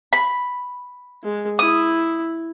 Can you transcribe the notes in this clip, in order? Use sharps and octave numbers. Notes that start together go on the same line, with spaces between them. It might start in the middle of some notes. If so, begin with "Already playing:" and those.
B5
G#3
E4 D#6